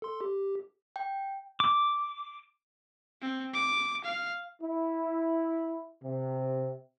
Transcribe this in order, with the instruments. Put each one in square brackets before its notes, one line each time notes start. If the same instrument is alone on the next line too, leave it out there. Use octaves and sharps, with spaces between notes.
[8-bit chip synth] A4 C6
G4
[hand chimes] G5
[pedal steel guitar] D6
[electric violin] C4
D6
F5
[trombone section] E4
C3